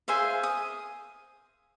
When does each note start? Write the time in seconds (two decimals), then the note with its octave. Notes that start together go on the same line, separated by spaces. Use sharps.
0.08 G#4 C5 E5 F5
0.43 D#6